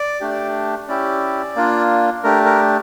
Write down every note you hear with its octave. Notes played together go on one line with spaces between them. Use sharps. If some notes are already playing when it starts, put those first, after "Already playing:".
Already playing: D5
A3 D4 G4
C#4 E4 G4 D5
A#3 D4 F4
A3 D4 G4 A#4
A#4